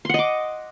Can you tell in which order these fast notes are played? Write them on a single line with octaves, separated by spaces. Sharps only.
C6 F#5 D#5 D6